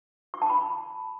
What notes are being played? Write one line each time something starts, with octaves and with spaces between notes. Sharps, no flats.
C#6
A5
B5